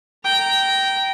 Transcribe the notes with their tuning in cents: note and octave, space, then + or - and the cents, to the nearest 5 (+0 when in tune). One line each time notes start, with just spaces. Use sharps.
G5 -15 A#5 +0